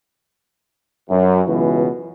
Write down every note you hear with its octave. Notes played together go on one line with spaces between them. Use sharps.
F#2
C#2 B2 E3